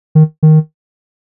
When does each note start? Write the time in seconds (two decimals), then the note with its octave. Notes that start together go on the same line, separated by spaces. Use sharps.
0.15 D#3
0.43 D#3